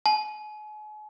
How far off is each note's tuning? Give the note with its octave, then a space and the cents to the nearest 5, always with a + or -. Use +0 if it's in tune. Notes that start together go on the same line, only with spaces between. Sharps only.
G#5 +40